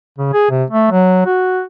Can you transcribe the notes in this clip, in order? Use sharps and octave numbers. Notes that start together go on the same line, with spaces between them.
C#3
G#4
C3
A3
F#3
F#4